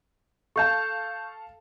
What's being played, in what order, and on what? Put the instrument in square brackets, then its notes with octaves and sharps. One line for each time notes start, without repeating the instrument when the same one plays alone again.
[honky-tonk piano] A4 F5 A5 [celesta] C#6 G6